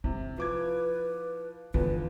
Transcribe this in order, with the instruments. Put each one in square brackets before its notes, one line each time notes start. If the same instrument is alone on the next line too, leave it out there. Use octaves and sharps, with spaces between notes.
[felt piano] C3 [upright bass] E4
[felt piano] F3 D6 G#6 [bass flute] B4
[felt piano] E2 F3 [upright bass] D3 [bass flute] B4